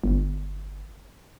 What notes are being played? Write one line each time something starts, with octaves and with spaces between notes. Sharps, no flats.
G1